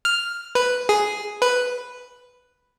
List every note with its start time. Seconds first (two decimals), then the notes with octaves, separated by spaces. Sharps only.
0.05 F6
0.55 B4
0.89 G#4
1.42 B4